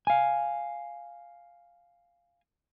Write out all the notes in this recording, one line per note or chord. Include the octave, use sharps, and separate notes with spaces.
F5 G#5